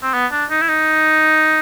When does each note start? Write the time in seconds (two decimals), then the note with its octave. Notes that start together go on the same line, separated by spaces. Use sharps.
0.02 C4
0.14 B3
0.32 D4
0.50 D#4
0.62 E4
0.69 D#4